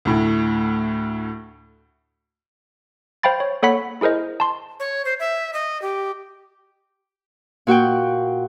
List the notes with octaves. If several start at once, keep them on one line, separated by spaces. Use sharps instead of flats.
D2 A2
C5 F5 G5 B5 A6
C#5
A#3 A4 C#5 F#5 B5 B6
E4 G#4 A#4 C5 D#5
A5 C6
C#5
C5
E5
D#5
G4
A#2 F#4 F#5 G5